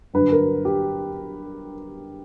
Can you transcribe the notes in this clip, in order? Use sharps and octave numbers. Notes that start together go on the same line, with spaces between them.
G2 D3 F#3 B4
A#4
G4